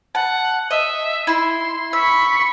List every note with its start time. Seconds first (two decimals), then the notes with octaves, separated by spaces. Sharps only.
0.15 F#5 A5
0.71 D#5 E5
1.27 E4 C6
1.93 B5 C#6 E6 B6